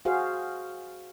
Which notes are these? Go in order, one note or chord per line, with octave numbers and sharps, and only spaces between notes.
F#4 G#4 C5 F5